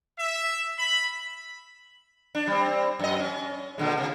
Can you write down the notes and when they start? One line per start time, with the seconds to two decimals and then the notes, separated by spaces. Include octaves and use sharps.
0.19 E5
0.79 B5
2.35 D4
2.47 G3 C4
2.99 F#2 D#5
3.20 C#4
3.78 A#2 D3 G#3
3.98 C3